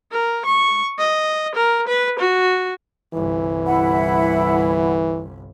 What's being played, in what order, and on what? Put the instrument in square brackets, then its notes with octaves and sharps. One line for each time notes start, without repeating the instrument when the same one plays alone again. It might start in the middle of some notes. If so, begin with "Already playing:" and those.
[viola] A#4
C#6
D#5
A#4
B4
F#4
[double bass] G1 C2 [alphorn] E3
[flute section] E4 F#5 B5